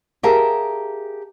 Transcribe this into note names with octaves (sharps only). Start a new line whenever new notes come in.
G4 G#4 A#4 E5 F5 A5